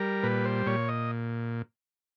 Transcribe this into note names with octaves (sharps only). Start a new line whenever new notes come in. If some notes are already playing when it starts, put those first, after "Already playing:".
Already playing: G3 A#4
A#2 B4
C5
A#2 C#5
D#5